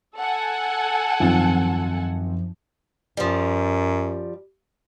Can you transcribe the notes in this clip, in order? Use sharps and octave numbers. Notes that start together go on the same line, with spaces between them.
A4 F#5 G#5
G#1 F#2 F3 C4
F#2 F3 G3